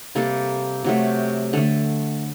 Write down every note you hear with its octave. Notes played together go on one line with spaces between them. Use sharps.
C3 G3 A#3 A4
C3 F#3 A3
D3 A3 A4